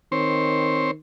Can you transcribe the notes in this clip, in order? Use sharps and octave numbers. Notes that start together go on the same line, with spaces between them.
D#3 C4 C5 C#5